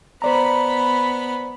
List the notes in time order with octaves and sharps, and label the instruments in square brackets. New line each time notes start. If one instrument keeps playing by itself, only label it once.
[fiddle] B3 B5 [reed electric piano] C5 D5 A#5